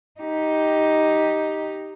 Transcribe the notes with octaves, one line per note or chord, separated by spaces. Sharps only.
D#4 G4